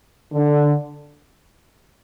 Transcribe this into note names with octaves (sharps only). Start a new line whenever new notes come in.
D3